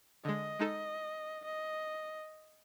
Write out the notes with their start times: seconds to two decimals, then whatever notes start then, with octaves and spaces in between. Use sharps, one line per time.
0.25 D3 G#3 D#5
0.59 G#3 D#4 A4
1.45 D#5